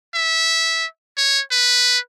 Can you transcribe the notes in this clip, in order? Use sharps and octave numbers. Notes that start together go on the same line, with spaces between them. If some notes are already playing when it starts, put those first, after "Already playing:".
E5
C#5
B4